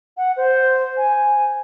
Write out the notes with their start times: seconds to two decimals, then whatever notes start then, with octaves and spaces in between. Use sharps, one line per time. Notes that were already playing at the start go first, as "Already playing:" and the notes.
0.17 F#5
0.37 C5
0.97 G#5